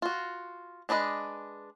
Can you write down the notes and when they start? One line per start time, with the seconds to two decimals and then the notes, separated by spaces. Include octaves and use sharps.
0.02 F4 F#4
0.89 G#3 D4 B4 D#5